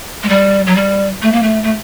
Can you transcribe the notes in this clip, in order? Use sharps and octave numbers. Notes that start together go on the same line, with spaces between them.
G#3
G3
F#3
G3
A3
A#3
A3
A3